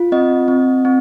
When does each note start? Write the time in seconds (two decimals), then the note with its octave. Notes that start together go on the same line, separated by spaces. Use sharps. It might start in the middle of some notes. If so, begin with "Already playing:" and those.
Already playing: F4
0.12 C4 D#5
0.48 C4
0.85 C4